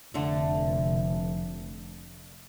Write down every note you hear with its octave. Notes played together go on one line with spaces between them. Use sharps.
F1 D3 A3